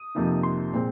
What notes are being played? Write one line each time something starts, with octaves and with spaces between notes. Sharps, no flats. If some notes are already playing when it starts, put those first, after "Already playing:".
Already playing: D#6
F2 C3 F3 A#3 D#4
C6
A#2 G#3 C4